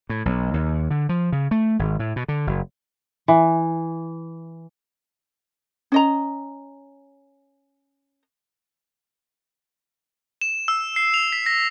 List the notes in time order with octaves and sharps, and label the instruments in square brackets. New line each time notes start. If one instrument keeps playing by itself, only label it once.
[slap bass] A2
B1
D#2
D3
F3
C#3
A3
G#1
A2
B2
D3
F#1
[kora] E3
[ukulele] C#4 D#5 A#5
[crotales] E7
E6
C7
F7
B6
A#6